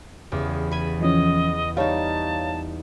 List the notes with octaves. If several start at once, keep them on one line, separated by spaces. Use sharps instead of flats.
E2 C#3 G4
G#5 B5
E3 F3 C#4 D#5
G3 D#4 C#5 F5 A5